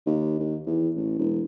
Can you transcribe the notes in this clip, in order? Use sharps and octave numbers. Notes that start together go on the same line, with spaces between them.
D#2
D#2
E2
A1
E1